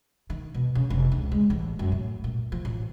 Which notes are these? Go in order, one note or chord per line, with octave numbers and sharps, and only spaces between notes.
D#3
B2
C#3
F1
C#2
G#3
A1
F#2
A2
A#2
F3
A1